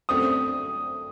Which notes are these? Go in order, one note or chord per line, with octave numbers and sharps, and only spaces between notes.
G1 F#2 D3 A3 C4 D#6